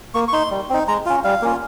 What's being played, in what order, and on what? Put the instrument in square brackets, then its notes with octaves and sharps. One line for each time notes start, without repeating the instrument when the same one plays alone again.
[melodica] A#3 C#6
C#6
D#4 C6
G3
C4 D#4
G#3 A#5
C#4 F4
G3 F5
A#3 C#4 F4